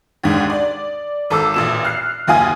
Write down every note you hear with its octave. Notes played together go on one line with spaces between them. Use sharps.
D#2 G#2 D3
D5
G#1 A4 D6 E6
A1 A#2 E7
F6 F#6 C7
F#1 D#2 A#3 F4 G#5 D#6